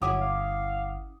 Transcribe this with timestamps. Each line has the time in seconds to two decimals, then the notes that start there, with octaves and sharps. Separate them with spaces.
0.02 G1 F#3 C#4 E4 G#4 F#5 D6 D#6
0.21 F5